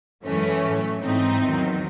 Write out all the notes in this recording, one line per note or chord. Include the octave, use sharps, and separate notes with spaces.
F#2 E3 G#3 A3 C#4
A2 F#3
G#2 E3 G#3 C4 D#4
E2 D#3 F#3